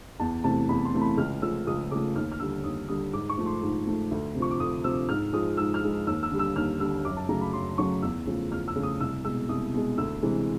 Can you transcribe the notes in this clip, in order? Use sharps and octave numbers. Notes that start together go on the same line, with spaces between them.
E2 A5
C3 E3 A3 A5
E2 B5
C6
C3 E3 A3
B5
C#2 F6
C#3 F3 A3 E6
C#2 D#6
C#3 F3 A3 D6
D#2 F6
F6
D3 G3 E6
D#2 D#6
D3 G3 D#6
G#2 D6
C#6
F3 A3
C6
G#2
F3 A3
D2
C3
F3 C#6
D6
D2 D#6
C3 F3 E6
G#2 F6
F3 G#3 D#6
G#2 E6
F6
F3 G#3
D#2 E6
E6
D3 G3
E6
D#2 F6
D3 G3 E6
F#2 D6
A5
C#3 F#3 A3 A#5
B5
F#2 C6
C#3 F#3 A3 C#6
E2 E6
C#3 F3 A3
E2 F6
E6
C#3 F3 A3
D#6
C2 E6
B2 G#3 E6
C2 D#6
B2 G#3
D2 E6
C3 E3 G#3